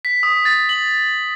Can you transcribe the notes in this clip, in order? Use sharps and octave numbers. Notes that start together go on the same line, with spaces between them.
B6
D#6
A6
F#7